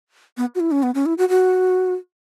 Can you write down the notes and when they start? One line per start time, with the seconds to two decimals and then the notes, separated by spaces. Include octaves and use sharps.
0.37 B3
0.55 F#4
0.60 E4
0.72 C#4
0.83 B3
0.95 C#4
1.06 E4
1.18 F#4
1.29 F#4